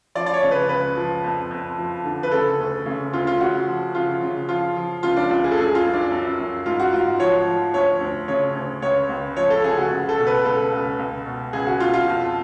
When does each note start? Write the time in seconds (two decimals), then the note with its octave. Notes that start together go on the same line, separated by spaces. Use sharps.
0.15 F3 D5
0.26 D5
0.34 C#5
0.43 C#3
0.51 B4
0.69 C#2 B4
0.97 F3
1.24 F2
1.51 F2
1.78 F3
2.05 D3
2.23 B4
2.32 C#3 A4
2.59 D2
2.86 C#3
3.13 D2 F4
3.27 F4
3.40 C#3 F#4
3.68 F3
3.94 C#3 F4
4.22 C#3
4.49 F3 F4
4.76 F3
5.03 C#2 F4
5.17 D4
5.30 C#2 F4
5.44 G#4
5.52 A4
5.58 F#2 G#4
5.75 F4
5.85 F#2
5.94 D4
6.11 F#2
6.39 F#2
6.66 G#2 F4
6.79 F#4
6.93 G#2 F4
7.19 F3 C#5
7.47 F3
7.74 D2 C#5
8.01 D2
8.28 C#3 C#5
8.55 D2
8.82 C#2 C#5
9.09 C#2
9.36 F3 C#5
9.50 A4
9.64 C#3 G#4
9.77 F#4
9.91 C#2
10.09 A4
10.18 B2
10.27 B4
10.45 C#2 A4
10.72 C#2
10.99 C#2
11.26 B2
11.53 C#2 G#4
11.67 F#4
11.80 B2 F4
11.94 F4
12.08 F2